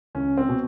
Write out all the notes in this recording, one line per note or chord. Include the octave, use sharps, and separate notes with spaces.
C#2 C#4
C4
B2